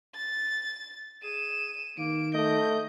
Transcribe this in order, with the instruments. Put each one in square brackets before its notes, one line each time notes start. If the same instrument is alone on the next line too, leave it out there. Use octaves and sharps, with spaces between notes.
[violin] A6
[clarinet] G#4 [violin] D#7 E7
[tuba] D#3 [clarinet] A#3 [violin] D7
[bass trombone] A3 [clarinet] D#5 [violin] G6